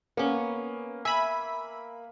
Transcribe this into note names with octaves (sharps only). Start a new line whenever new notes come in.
A#3 B3 C#4
E5 G#5 B5